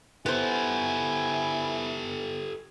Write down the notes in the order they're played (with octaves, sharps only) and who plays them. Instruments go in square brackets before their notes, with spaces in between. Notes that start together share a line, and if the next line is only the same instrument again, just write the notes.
[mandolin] B3 C5 [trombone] E4 [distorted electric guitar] G4 A4 [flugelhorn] G#5